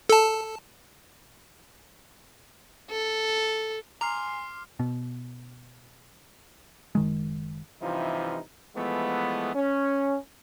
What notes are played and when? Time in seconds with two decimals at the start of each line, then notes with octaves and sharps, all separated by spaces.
0.09 A4 A5
2.91 A4
4.01 G#5 A#5 C6 D6 F6 C7
4.79 B2
6.95 F#1 D#3 G#3
7.82 G2 C3 E3 F3 D#4 F4
8.76 E3 F3 G#3 A3 B3
9.55 C#4